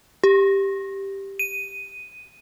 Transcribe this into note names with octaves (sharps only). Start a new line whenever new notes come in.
G4
D#7